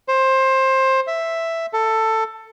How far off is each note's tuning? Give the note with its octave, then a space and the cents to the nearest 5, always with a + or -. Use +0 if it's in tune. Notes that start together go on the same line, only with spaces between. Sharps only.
C5 +20
E5 +5
A4 +15